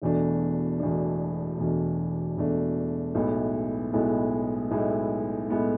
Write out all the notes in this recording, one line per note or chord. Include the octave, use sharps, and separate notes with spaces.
E1 E2 B2 A3 D4
E1 E2 B2 A3 D4
E1 E2 B2 A3 D4
E1 E2 B2 A3 D4
B1 A2 G#3 B3 E4
B1 A2 G#3 B3 E4
B1 A2 G#3 B3 E4
A2 G#3 B3 E4